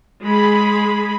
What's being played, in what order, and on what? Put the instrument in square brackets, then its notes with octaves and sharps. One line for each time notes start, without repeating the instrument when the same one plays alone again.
[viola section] G#3 G#4 B5